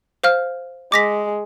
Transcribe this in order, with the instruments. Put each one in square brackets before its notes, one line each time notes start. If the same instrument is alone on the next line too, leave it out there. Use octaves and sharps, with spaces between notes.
[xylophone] C5 F5 F6
[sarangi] G#3 [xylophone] D6 A#6 B6